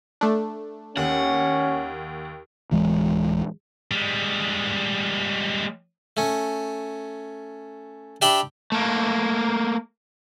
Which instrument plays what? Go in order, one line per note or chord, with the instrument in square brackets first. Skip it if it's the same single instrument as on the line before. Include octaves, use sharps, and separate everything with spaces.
[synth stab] A3 D4
[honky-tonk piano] D#2 [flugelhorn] C#4 [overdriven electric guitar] F#5
[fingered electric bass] D1 E3 G#3
[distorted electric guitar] G3 G#3
[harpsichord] A3 C#4
D4 G4 E5 G5 B5
[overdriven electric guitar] A3 A#3